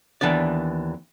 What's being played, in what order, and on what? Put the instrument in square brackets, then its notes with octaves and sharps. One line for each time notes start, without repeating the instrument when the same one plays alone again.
[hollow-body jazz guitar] D#2 E3 B3 D4 D5